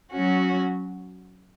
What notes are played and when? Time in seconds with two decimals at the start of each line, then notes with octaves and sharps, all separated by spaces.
0.12 F#3 C#4 F#4